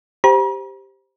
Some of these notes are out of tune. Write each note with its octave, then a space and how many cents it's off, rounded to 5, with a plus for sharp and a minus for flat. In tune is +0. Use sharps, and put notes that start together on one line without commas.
G4 +0 C5 +0 A#5 +45